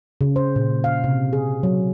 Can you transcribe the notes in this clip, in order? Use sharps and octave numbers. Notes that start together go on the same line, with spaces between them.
C#3
C5
A#2
F5
C3
G#4
F#3